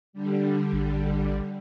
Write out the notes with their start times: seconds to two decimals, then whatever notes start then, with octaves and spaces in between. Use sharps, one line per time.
0.13 D3 G3
0.73 A1